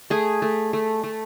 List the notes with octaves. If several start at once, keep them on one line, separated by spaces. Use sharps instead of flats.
A3 G#4
A3
A3
A3